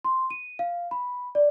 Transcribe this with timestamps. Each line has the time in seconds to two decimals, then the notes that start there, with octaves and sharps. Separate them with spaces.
0.04 C6
0.30 D#7
0.59 F5
0.91 B5
1.35 D5